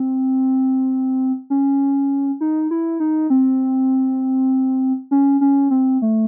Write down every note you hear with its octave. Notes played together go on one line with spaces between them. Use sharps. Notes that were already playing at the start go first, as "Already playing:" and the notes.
Already playing: C4
C#4
D#4
E4
D#4
C4
C#4
C#4
C4
A3